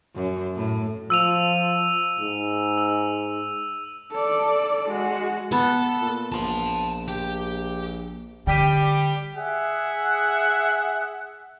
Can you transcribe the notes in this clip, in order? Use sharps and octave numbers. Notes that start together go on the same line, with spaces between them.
F#2
A2
F3 E6 D#7 F7
G#2
E6
A4 D5
G#3 F#4
B3 A4
A#2
A#1 A5 C6
G4
D3 G3 G4 G5 B6 D#7
G#4 E5 F#5